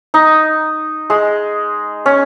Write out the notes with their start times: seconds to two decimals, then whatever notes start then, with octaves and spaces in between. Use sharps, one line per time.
0.14 D#4
1.10 G#3
2.06 C#4